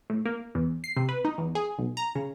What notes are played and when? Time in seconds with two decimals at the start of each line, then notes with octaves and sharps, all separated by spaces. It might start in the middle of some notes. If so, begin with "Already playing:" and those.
0.10 A2
0.25 A#3
0.55 E2
0.84 C7
0.97 C3
1.09 B4
1.25 D#4
1.38 E2
1.55 G#4
1.78 B1
1.97 A#5
2.15 C#3